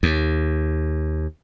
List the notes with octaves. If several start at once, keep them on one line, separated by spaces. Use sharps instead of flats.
D#2